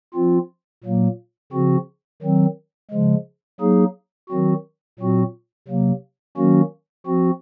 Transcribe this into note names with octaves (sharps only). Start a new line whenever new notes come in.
F3 C4 F4
A#2 F#3 A#3
C#3 F3 C4 F#4
D#3 F#3 C4
C#3 F3 G#3
F#3 A#3 D#4 G#4
D#3 F#3 C4 F#4
A#2 F#3 C4 F#4
C3 F#3 A#3
D#3 F#3 A#3 C#4 F#4
F3 C4 F#4